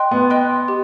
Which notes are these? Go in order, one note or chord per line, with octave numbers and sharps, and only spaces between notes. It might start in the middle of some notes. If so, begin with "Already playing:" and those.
Already playing: D#5 G5 C6 F#6
B3
D#5 G5 C6 F#6
G4